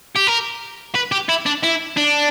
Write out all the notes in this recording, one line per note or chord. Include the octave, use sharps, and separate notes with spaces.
G4
A#4
B4
G4
E4
D4
E4
D4